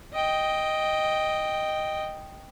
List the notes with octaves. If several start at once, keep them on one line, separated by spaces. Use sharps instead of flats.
D#5 G5